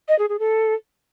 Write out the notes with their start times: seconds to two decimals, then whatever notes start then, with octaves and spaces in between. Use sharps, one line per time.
0.08 D#5
0.19 G#4
0.29 G#4
0.39 A4